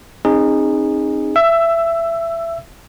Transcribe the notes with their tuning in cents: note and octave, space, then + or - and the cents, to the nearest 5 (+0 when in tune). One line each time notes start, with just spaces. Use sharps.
C4 +40 D#4 -10 G#4 -20
E5 +20 E6 +5